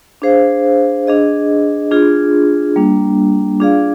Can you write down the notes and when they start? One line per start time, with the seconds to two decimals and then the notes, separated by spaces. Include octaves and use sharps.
0.22 D4 G#4 C5 F5
1.07 D4 G#4 D#5
1.91 D4 F4 G#4
2.76 G3 A#3 D4
3.60 D4 F4 G#4 D5 F5